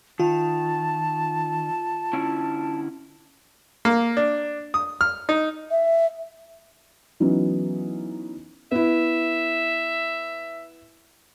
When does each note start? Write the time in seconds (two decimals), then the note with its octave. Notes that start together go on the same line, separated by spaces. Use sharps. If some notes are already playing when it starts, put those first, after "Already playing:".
0.20 D#3 F4 A5
2.13 D3 C#4 E4
3.85 A#3
4.17 D4
4.74 D#6
5.01 F6
5.29 D#4
5.71 E5
7.20 E3 F#3 B3 C#4 D#4
8.72 B3 E4 E5